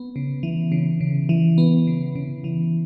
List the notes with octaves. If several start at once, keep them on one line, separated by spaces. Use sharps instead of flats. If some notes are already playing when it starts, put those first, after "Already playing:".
Already playing: B3
C#3
E3
C#3
C#3
E3
B3
C#3
C#3
E3